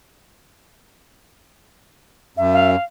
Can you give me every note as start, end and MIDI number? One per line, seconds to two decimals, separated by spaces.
2.37 2.76 42
2.37 2.71 76
2.53 2.84 77